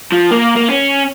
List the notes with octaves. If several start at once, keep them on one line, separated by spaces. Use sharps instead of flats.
F3
A#3
A#3
C#4